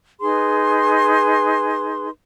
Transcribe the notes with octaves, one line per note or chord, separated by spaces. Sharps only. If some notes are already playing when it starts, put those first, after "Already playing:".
D#4 G#4 B4 C6